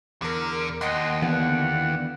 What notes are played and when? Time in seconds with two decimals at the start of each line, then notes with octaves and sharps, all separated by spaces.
0.22 E2 D3 A#4
0.81 D#2 D#5 F#5 C6
1.22 D3 E3 B3 F#5